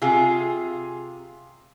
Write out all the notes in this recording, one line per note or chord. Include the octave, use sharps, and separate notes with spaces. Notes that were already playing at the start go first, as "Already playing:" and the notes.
C3 F4 G#4